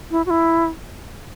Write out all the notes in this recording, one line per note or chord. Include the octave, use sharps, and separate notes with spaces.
E4
F#4
E4